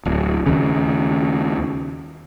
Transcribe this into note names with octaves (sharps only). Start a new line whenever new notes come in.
D1
D#2 C#3